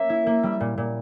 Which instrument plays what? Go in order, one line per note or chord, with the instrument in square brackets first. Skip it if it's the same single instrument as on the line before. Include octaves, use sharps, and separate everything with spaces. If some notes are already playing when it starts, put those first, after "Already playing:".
Already playing: [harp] A#3 C#4 [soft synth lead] E5
[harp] E4
A#3
G3
A#2
A#2